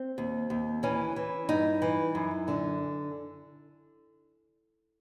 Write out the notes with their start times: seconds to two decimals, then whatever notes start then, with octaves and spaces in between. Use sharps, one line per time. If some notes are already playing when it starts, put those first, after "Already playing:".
Already playing: C4
0.18 D#2
0.50 D#2
0.83 E3 C#4
1.16 E3
1.49 G2 D#4
1.82 E3
2.15 F#2
2.48 D3